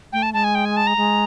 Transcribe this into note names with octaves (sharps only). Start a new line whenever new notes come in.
A3 G5
A5
G#3 A5
G#5
G5
G#5
A5
A#5
G#3